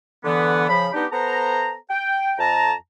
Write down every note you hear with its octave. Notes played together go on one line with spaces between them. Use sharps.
D3 E3 B3
C#3 F3 B5
B3 D4 D#4 G4
B3 A4 C5 A#5
G5
F2 A5 A#5